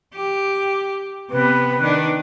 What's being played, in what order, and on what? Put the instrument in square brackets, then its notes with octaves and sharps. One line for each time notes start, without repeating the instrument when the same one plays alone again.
[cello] G4
[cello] C3 B3 [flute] B4
[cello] D#3 D4